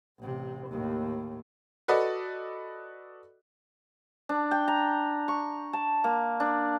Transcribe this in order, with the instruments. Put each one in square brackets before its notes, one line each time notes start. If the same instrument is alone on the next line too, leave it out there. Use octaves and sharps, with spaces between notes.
[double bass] A1 C3
D#2 A2
[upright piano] F#4 A4 B4 D5 D#5
[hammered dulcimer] D4
G5
A#5
C#6
A5
A#3
D4